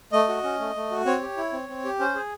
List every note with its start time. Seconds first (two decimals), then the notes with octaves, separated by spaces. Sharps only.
0.12 A3 D#5
0.29 F#4
0.44 C#4
0.60 A3
0.75 A3
0.91 F#4
1.06 C4 C#5
1.21 G4
1.37 E4
1.53 C4
1.69 C4
1.84 G4
2.00 C#4 C5
2.15 G#4